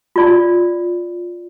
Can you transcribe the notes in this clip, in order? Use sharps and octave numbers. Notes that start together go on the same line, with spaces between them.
F4 D5